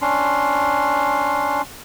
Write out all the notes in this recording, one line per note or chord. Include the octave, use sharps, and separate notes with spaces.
C#4 D4 C6